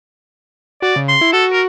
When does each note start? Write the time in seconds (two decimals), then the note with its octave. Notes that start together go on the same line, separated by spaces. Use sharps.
0.82 F#4 D5
0.96 C#3
1.09 C6
1.21 E4
1.33 F#4 A4
1.53 A#4